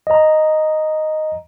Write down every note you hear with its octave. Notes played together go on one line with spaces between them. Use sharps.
D#5 A#5